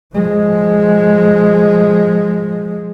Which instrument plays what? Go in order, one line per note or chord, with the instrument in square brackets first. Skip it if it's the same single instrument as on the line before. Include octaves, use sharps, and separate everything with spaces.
[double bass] F3 G#3